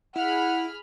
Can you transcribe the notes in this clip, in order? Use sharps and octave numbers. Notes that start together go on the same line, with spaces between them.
E4 G#4 F#5 B5 F6